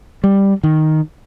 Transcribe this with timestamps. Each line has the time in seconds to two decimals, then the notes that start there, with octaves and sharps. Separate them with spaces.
0.24 G3
0.64 D#3